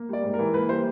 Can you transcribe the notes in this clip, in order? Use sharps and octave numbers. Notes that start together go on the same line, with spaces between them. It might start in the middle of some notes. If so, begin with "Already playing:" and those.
Already playing: A#3
G3 D5
G#2
A#4
E3
A#3 B4
G3 C5